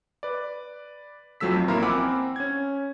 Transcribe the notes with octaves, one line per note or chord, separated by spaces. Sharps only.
B4 D5
F2 F3 F#3 A3 E6 B6
A1 A#3 E4 A#5 C6 F6
C4 F#5 G#5 B5 D6 E6
C#4 G#6